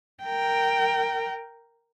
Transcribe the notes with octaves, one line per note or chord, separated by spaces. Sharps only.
A#4 G5